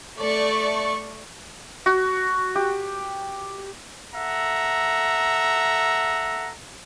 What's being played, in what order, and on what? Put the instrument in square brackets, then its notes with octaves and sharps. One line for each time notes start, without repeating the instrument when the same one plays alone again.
[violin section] A3 D5 C#6
[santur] F#4
G4
[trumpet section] A4 E5 F#5 A#5